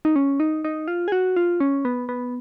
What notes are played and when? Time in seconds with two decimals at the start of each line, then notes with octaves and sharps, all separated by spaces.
0.05 D#4
0.16 C#4
0.40 D#4
0.65 D#4
0.88 F4
1.08 G#4
1.12 F#4
1.36 F4
1.60 C#4
1.85 B3
2.09 B3